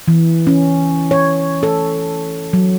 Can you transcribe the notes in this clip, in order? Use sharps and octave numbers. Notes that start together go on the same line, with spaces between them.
E3
C#4
C#5
A4
F#3